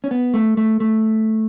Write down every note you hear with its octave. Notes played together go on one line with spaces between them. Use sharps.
C#4
B3
A3
A3
A3